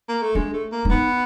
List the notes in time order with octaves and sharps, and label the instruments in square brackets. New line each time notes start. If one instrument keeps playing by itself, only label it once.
[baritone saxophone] A#3
A3
[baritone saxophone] G#3 [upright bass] D4
[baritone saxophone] A3
A#3
[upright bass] D4
[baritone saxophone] B3 [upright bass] D#4